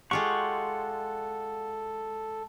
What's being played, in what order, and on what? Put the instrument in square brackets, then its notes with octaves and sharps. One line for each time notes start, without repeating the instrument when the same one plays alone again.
[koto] G#3 F4 G4 [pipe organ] A4 [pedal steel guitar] F#5 C#6